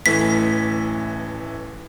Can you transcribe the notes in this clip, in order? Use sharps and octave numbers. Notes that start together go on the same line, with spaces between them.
A1 E3 A3 B6